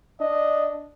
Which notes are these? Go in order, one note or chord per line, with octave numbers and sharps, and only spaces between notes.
D4 D#5